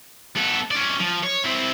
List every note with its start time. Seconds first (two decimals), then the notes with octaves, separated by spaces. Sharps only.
0.36 B3 A4
0.71 C#4 D5
1.00 F3
1.23 C#5
1.44 C4 E4